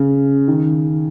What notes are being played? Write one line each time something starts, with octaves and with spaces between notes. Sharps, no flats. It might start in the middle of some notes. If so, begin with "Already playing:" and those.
Already playing: C#3
D#3